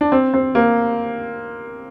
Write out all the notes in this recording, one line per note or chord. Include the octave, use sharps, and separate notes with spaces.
D4
C4
C4
A#3